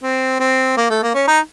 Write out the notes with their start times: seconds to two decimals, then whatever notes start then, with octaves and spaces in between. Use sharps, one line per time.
0.03 C4
0.40 C4
0.77 A#3
0.90 A3
1.03 A#3
1.14 C#4
1.28 D#4